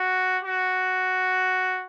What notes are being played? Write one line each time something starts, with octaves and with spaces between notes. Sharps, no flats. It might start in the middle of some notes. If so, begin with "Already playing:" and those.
Already playing: F#4
F#4